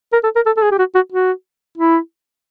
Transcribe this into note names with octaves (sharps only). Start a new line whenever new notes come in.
A#4
A4
A#4
A4
A4
G#4
G4
F#4
F#4
F#4
E4